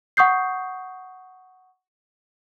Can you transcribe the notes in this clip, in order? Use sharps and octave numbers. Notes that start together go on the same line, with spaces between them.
F#5 C#6 D#6 G6 C7